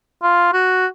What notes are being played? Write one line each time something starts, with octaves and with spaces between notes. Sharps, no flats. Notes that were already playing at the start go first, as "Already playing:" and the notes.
F4
F#4